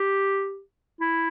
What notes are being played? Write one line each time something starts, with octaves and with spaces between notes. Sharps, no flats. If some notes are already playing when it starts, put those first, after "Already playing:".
Already playing: G4
E4